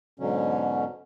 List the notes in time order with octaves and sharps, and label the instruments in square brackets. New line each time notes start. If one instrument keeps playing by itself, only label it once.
[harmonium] G#2 B2 D3 F#3 C#4